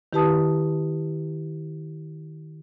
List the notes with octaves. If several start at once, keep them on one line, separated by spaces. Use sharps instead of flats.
D#3 E4 G4 B4 A5 D#6